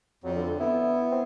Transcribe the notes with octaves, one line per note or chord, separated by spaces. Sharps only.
F2 F#3
D3
B3 E4
C4